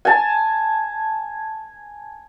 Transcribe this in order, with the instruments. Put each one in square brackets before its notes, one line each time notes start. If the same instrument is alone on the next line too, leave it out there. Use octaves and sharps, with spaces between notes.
[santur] G#5 A5